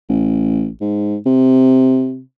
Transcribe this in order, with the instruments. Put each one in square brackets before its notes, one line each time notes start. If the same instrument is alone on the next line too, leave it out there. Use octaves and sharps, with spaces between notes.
[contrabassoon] A1
G#2
C3